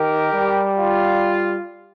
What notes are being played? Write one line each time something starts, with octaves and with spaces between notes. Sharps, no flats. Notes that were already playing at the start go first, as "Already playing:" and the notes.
Already playing: D#3 G4 A#4
G3
F4